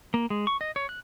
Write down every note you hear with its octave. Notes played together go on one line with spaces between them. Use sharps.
A#3
G#3
C#6
D#5
C#5
F#6